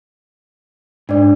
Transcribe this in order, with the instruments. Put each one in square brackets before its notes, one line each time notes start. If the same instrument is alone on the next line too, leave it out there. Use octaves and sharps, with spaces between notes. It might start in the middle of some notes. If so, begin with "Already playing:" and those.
[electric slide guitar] G#2 [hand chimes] D4 D5